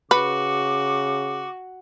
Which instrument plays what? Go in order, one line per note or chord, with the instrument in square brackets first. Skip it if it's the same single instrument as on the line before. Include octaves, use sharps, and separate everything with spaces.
[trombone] C#3 [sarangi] F#4 [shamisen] B4 [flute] D6